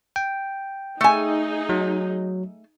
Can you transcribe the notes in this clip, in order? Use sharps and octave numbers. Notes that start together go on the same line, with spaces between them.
G5
A3 D#4 G#4 G#5
F#3